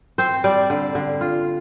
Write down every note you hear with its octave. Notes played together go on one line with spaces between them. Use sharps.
C4 C5
G3 D5
D3
D3
F4